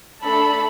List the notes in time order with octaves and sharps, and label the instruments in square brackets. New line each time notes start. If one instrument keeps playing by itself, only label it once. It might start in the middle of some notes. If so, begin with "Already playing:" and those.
[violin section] A3 D4 A4 [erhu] B5